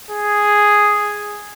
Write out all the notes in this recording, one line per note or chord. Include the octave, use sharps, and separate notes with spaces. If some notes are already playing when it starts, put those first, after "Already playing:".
G#4